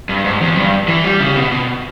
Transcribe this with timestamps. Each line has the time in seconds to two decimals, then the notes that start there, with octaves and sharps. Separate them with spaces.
0.09 G2
0.25 G#2
0.41 E2
0.57 G2
0.88 E3
1.04 G3
1.20 C#3
1.36 B2
1.52 B2